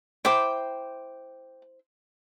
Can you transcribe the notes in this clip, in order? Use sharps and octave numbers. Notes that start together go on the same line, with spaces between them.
E4 C5 G5 D6